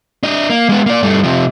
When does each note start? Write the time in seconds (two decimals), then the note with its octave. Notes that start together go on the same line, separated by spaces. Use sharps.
0.23 D4 D#5
0.50 A#3
0.69 G#3 B3
0.86 A#3 D5
1.03 G2 A3
1.24 C3 F3